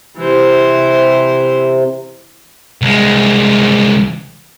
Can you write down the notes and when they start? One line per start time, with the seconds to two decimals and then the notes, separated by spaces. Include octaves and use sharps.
0.17 C3 E3 C5
2.82 C2 G#3